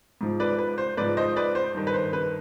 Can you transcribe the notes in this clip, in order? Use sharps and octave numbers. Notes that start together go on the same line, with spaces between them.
G#2 F3
B4 D5
B4
C5
G#2 F3 B4 D5
C5 D#5
B4 D5
C5
G2 D#3
B4
C5
B4